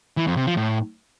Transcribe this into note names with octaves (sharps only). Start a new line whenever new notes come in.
E3
F2
C3
F3
A2